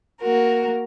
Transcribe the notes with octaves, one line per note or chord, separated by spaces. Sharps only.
A#3 F#4 A#4